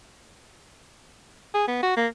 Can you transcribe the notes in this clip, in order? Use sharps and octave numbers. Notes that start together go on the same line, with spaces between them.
G#4
B3
F#4
A#3